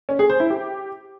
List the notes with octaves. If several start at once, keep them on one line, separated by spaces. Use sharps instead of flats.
C#4
G#4
C5
E4
G4